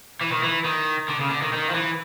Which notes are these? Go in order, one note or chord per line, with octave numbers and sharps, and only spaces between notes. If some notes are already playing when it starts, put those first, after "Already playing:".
E3
D#3
E3
D#3
D3
C#3
D3
D#3
D#3
F3
E3